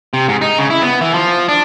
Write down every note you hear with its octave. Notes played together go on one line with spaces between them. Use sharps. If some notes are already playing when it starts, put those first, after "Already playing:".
C3
G#2
D#4
C#3
E4
B3
E3
F3
D4